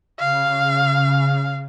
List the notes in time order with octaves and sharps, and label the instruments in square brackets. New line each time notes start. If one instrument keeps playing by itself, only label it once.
[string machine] C#3 [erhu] F5